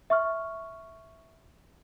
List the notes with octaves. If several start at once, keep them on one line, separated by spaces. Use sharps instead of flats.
E5 C#6 F6